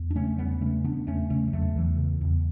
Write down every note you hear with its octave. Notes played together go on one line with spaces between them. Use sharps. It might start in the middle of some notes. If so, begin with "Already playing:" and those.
Already playing: E2
D4
C#3 A3 C#4
E2 G3 B3
C#3 A3 C#4
C#3 B3 D4
E2 A3 C#4
C#3 A3 C#4
G3
E2 F#3 A3
E2 E3
C#3
E2